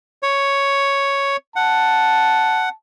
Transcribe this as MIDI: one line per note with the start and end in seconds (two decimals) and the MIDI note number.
0.23 1.37 73
1.56 2.69 78
1.56 2.73 81